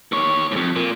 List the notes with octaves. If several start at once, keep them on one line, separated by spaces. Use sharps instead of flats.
D#2 C#5
F2 G#2
A#2